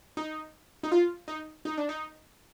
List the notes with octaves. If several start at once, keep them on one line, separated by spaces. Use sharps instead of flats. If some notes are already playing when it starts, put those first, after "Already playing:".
D#4
D#4
F4
D#4
D#4
D4
D#4